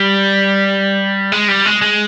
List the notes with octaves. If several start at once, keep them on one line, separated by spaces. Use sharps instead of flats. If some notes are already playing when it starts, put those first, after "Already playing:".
Already playing: G3
G#3
G3
G#3
G#3